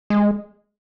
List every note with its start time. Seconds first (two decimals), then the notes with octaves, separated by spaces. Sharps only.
0.10 G#3